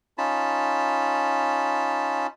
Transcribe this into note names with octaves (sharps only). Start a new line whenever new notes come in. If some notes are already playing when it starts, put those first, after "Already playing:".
C#4 D#4 F4 A5 B5